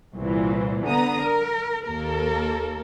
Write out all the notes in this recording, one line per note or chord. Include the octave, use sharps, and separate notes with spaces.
C2 A#2 E3
D3 B3 A#5 D#6
A#4
D#2 A#3 A4 A#4